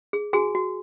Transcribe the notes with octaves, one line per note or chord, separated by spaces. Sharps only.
G#4
F#4 G#4 G#5
F#4